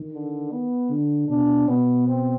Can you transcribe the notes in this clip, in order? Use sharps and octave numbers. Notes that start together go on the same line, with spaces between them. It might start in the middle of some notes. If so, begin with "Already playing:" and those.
Already playing: D#3
D3
B3
D3
B2 D4
B2 B3
C4